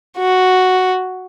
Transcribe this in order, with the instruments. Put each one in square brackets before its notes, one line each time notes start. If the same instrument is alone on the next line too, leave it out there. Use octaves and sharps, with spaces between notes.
[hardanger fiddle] F#4